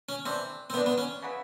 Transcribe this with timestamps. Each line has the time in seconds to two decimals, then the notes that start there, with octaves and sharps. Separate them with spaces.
0.09 C#4
0.25 C3 E3 A3 C4 D4
0.70 C4
0.74 C3 E3 A3 B3 D4
0.86 B3
0.98 C#4
1.22 C#3 F#3 B3 E4